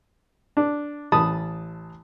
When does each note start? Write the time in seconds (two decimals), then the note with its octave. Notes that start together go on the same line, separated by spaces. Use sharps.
0.57 D4
1.12 A1 A5 B5 D#6